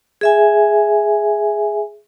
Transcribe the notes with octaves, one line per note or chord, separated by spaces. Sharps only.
G#4 E5 G#5